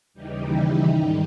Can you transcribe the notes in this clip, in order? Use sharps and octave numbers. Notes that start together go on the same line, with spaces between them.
D#2 C#3 E3 G3 D#4 G4
E4
G#2 D#3 G3 D#4